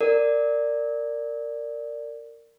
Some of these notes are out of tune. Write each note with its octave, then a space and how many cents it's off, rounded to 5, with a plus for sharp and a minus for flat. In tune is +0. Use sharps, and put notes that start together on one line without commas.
A#4 -20 D5 +0